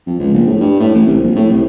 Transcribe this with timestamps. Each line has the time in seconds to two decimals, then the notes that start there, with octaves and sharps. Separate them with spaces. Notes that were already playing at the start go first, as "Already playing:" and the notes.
0.07 F2
0.20 C#2
0.34 A#1
0.47 A2
0.60 G2
0.79 A2
0.94 A1
1.06 C2
1.23 A#1
1.35 A2
1.50 C2